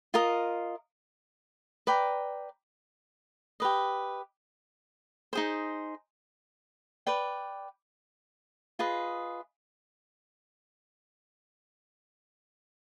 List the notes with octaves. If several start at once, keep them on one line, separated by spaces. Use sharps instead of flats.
F4 A#4 D#5
B4 D5 G5 A#5
G4 B4 D#5
D#4 G#4 C5
B4 D5 G5
F4 G#4 B4 D#5